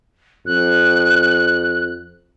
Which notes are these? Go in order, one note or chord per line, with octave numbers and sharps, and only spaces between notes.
F2 F#6